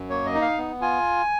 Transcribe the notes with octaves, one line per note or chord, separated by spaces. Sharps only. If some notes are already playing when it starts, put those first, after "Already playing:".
Already playing: F#2
A#3 C#5
D#5
D#4
F5
B3
F4 G#5